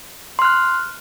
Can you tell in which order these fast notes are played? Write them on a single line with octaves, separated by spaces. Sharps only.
C6 F6 F#6